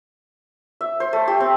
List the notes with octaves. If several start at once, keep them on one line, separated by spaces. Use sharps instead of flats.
E5
C5
A3
G4
C4